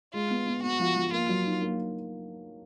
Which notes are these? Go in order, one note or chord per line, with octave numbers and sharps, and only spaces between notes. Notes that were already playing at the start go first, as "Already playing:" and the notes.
G#3 F4
B3
B3
B3 F#4
F3
F3
A#3 F4
F#3
D#4
A#3